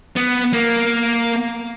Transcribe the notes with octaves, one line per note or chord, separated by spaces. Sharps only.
B3
A#3